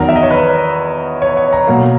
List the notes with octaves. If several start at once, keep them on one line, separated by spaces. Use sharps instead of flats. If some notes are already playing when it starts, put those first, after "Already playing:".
Already playing: E2 D#3 F#3 B3 D#4 A#4
E5
D#5
C#5
B4
C#5
C#5
A#5
B2 F#3 A#3